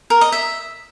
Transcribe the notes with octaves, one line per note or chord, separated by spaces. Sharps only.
A#4
D#5
E5